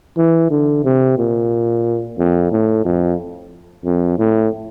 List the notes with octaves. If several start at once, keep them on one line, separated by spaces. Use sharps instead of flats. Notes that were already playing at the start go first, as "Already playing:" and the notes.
E3
D3
C3
A#2
F2
A2
F2
F2
A2